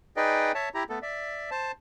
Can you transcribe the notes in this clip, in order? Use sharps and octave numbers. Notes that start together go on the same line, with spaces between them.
D#4 G#4 B4 D5 D#5 G5
C#5 E5 A5
E4 G4 A#5
A3 B3 A4
D5 E5
C5 A5